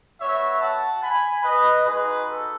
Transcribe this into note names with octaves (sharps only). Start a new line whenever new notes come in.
B3 F#4 C#5 E5
F#5 A5
G#5 B5
B4 D#5
G#3 D#4 F#4 G#4 B4
A4